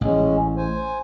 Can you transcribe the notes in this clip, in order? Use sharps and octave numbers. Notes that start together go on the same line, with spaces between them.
A1 G#3 C#4
C5 G#5